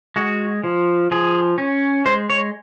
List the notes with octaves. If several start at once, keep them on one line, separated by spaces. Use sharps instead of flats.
G#3 F#4
F3
F3 G#4
C#4
G#3 C5
C#5